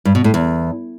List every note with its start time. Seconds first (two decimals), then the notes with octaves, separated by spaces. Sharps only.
0.05 G2
0.15 B2
0.24 A2
0.34 E2